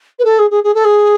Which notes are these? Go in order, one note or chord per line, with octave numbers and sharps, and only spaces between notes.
B4
A4
G#4
G#4
G#4
A4
G#4